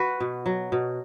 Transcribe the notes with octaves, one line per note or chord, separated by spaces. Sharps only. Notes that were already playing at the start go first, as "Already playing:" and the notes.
Already playing: F#4 B4
B2
F#3
B2